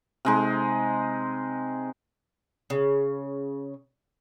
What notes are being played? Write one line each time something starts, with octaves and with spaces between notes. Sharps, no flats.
C3 G#3 D#4
C#3